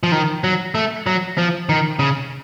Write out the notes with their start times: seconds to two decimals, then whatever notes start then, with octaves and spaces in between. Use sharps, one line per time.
0.03 F3
0.12 D#3
0.44 F#3
0.75 A3
1.07 F#3
1.38 F3
1.69 D#3
1.99 C#3